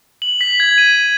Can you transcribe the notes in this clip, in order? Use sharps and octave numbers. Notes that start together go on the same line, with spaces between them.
F#7
B6
G#6
D#7